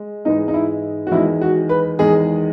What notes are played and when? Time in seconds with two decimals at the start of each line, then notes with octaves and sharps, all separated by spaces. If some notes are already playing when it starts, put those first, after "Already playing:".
Already playing: G#3
0.25 G#2 E3 G#3 D#4
0.48 D#4
0.54 E4
1.07 F#4
1.11 E2 D#3 G#3 E4
1.41 F#4
1.69 B4
1.99 E2 D#3 G#3 G#4